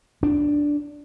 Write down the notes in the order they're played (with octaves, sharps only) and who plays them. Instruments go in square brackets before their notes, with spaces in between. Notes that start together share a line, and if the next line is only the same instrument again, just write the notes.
[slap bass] D4